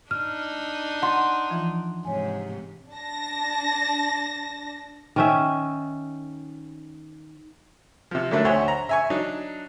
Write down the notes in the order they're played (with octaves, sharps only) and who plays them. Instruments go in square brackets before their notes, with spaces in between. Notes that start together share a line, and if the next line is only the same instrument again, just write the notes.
[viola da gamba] D4 D#4 [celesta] F6
[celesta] F#5 C6
[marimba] E3 F3 F4
[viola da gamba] G#2 C3 [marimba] C#5 G#5
[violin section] D4 A5 A#6
[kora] D#3 C#4 E5
[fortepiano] C3 F3
D3 D#3 F#3 A3 D4 E4
D2 C5 C#5 E5 F#5 G#5
A#5
E5 G#5 C#6
F#3 D4 D#4